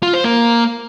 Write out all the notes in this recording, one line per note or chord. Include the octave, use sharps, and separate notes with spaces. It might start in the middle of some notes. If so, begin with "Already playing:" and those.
F4
C5
A#3